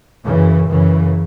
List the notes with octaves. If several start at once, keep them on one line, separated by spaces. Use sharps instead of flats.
F#2 C#3 E3
F#2 C#3 E3